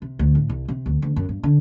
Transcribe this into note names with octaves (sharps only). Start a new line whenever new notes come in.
C3
D2
A2
C2
C3
D2
D2
F#2
G2
D3